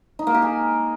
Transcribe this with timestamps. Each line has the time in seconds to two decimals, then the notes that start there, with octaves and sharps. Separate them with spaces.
0.19 D#4
0.27 A#3
0.34 G4
0.42 G#4